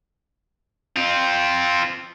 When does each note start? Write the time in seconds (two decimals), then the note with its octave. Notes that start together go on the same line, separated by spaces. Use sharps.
0.96 C4 F4